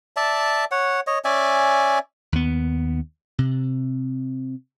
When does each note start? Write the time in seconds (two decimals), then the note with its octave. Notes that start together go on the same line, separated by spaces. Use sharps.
0.17 D5 E5 A5
0.71 C#5 F#5
1.07 C#5 D#5
1.25 C#4 D5 E5 G#5
2.32 D#2 B3
3.38 C3